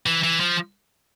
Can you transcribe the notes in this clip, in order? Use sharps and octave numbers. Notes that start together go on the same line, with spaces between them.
E3
E3
F3